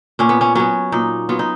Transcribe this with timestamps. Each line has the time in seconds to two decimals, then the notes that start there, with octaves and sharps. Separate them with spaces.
0.19 A#2 C#4
0.29 B3
0.41 C#4
0.55 F#3 B3 C#4
0.92 A#2 D#4
1.29 F#3 B3 F4
1.39 D#4